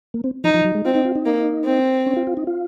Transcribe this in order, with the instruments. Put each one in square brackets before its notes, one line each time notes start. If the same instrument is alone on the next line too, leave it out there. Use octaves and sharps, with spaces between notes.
[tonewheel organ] A#3
C4
[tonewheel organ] F3 [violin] D#4
[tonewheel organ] F3
F#3
G#3
[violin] C4 [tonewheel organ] F4
[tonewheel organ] D#4
F4
D#4
[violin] A#3
C4
[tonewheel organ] C#4
F4
F4
D#4
F4